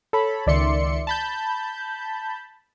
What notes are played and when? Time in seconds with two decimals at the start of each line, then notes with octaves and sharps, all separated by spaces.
0.13 A4 C#5 B5
0.46 C#2 D#3 D5 E5 C6 C#7
1.07 A5 B5 G6